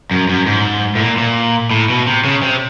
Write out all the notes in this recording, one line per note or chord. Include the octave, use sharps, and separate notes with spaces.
F#2
F#2
G#2
A2
A#2
A#2
A2
B2
C3
C#3
C3